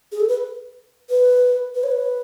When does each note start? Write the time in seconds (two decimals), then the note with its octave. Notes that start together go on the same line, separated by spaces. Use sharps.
0.12 G#4
0.20 A4
0.28 B4
1.10 B4
1.75 B4
1.83 C#5
1.91 B4